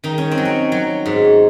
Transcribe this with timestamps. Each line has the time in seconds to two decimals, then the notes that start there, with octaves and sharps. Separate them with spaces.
0.04 D#3 D#4
0.18 C#4
0.31 C4
0.38 F#3
0.45 C#4
0.72 F#3
1.06 G#2